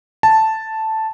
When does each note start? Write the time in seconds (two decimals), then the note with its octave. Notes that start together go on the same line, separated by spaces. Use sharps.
0.23 A5